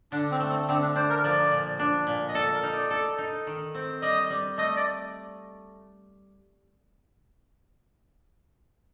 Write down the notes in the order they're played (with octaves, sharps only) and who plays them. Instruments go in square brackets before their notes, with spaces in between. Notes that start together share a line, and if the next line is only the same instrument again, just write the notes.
[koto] D3 [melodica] D4
[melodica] C4
[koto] A3
[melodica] C4
[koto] D3 [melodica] C4
[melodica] D4
[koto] D4 [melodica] C5
[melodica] A#4
[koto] F3 [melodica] D5
[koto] A#2
D4
A#2
[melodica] D#5
[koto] A4 [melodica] D5
[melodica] A#4
[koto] D#4
[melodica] D5
[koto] A4
D#4
D#3
C4
[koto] G3 [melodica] D#5
[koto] G3
[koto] A3 [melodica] D#5
[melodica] D5